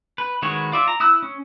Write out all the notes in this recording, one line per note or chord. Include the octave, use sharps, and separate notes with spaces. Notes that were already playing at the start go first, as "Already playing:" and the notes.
B4
D#3 G#3 F#4 B4 C#5
F4 D5 E5
A#5
E4 D#6 E6 F#6
C#4